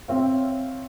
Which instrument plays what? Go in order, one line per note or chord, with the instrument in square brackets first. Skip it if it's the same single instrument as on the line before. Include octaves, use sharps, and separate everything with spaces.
[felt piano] C4 C#5 E5 F5